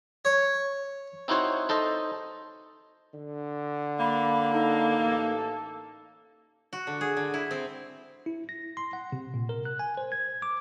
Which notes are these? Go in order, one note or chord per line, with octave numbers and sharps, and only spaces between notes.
C#5
C4 D#4 E4 F#4 C5 C#5
D#4 A4 C5 D#5
D3
A#3 B5
D#4 A4
A1
F#4
D3
G#4
D3
E4
C4
E4
A#6
C6
F#5
C3
A#2
A#4
F#6
G#5
C5
G#6
D6